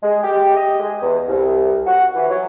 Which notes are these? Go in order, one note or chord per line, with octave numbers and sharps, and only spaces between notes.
G#3
G4
D#5
G#3
E2
C2
F#4
E3
F#3